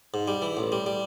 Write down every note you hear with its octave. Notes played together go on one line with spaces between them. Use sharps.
G#2
G3
E3
A1
G3
G3